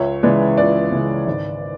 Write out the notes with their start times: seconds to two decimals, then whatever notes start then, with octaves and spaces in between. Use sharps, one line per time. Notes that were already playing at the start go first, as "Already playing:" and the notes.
Already playing: C#2 C#5 E5
0.23 C#3 E3 G#3 B4 D5
0.57 C#2 B4 D5
0.91 C#3 E3 G#3
1.27 G#1